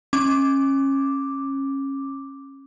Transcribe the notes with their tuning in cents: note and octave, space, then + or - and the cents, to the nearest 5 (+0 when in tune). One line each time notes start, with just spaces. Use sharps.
C#4 -25 D6 +0